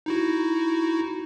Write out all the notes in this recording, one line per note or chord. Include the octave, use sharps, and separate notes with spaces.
D#4 E4 F#4